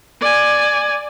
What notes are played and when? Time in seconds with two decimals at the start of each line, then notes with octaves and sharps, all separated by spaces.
0.20 D5 G#5